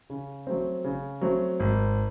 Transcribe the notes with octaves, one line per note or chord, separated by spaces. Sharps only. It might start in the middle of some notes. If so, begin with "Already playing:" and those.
C#3
F#3 A3 C4
C#3
F#3 A3 C4
G#1